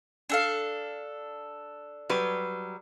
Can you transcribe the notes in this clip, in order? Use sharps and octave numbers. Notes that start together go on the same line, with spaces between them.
D4 A4 F5
F#3 G3 B4